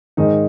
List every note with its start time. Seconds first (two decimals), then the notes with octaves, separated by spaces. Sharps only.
0.17 G#2 D#3 G#3 D#4